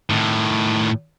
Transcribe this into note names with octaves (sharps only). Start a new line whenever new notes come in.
A2 D#3